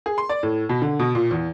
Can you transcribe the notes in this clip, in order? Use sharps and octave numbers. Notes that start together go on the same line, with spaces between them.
G#4
C6
D5
A2
B2
D3
B2
A#2
E2